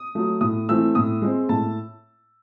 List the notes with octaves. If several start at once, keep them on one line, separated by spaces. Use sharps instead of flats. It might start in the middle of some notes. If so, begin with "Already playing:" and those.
Already playing: D#6
F#3 A3
A2 D#6
E3 A3 C4 E6
A2 D#6
G#3 C4
A2 A5